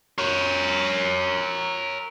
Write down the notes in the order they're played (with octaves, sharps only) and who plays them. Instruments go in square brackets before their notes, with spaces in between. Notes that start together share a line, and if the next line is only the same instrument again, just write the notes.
[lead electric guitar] A#4 C#5